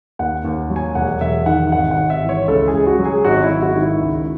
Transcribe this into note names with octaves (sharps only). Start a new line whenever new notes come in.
D#2 F#5
D#2
F#3
G#5
E1 F#5
E1 E5
D#3 F#5
G#1 F#5
F#5
G#1
E5
E3
C#5
C#2 A4
G#4
C#2
F#4
F#3
G#4
G#1 F#4
E4
G#1
F#4
D#3
E4
C#2